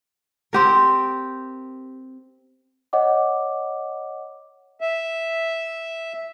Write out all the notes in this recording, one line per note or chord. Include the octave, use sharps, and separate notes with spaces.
C4 G4 A#4
C#5 D#5 F#5 D6
E5